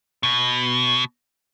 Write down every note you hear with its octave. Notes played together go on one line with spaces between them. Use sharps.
B2